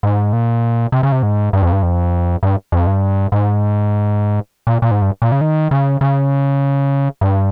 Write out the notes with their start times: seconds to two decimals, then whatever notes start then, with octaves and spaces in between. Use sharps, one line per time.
0.03 G#2
0.33 A#2
0.92 C3
1.03 C#3
1.12 C3
1.23 G#2
1.53 G2
1.62 F2
1.73 G2
1.83 F2
2.43 G2
2.72 F2
2.87 G2
3.32 G#2
4.67 A#2
4.82 A#2
4.91 G#2
5.02 G2
5.22 A#2
5.32 C#3
5.41 D#3
5.71 C#3
6.01 C#3
7.21 G2